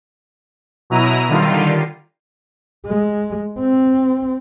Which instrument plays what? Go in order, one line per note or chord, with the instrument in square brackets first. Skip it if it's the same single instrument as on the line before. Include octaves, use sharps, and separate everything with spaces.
[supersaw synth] B2 F#3 E4 A#5 D#7
D3 D#3 G3 F4
[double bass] G#3
C4